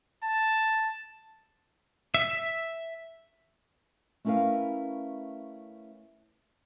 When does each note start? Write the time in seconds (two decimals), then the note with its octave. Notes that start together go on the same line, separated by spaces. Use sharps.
0.24 A5
2.14 E5
4.25 A3 C#4 E4 A#4 B4 F5